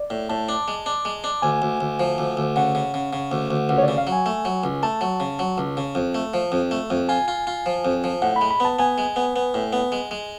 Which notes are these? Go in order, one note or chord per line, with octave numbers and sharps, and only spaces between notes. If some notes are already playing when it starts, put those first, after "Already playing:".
Already playing: D5
A2
A2 A5
D4
G#3
D4
G#3
D4
D2 G#5
D2
D2
F3
D2
D2
C#3 F#5
C#3
C#3
C#3
D2
D2
C#2 F#5
C#5
D5
C#3
F5
F#3
G#5
A3
F#3
C#2
A3 A5
F#3
C#3
F#3
C#2
C#3
F2
A3
F3
F2
A3
F2
F4 G#5
F4
F4
F3
F2
F3
A2 F#5
B5
G#3
B5
B3 A5
B3 G#5
G#3
B3
B3
A2
B3
G#3
G#3